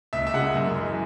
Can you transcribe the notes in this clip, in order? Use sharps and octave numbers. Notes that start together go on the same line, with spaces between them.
C#2 E5
E5
C#3 G#3 F#5
F#2
E3 G#3